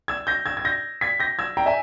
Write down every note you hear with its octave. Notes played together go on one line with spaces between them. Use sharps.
E6 G#6
G6 A#6
E6 G#6
G#6
G6 A#6
G#6 B6
G6 A#6
E6 G#6
G5 A#5
E5 G#5